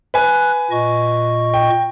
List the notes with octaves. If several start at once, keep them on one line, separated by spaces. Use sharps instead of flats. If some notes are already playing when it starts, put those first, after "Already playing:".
B4 G#5 F#6
A#2 D#5 C#6
G5